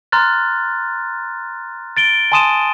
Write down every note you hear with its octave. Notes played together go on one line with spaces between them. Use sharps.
A#5 C6 F6 F#6 A6
A6 D7 G7
G#5 A5 C6 D#6 D#7 E7